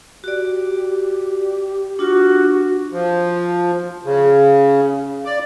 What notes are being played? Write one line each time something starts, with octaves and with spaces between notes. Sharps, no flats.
F#4 G4 D5
D4 F4 F#4
F3
C#3
D5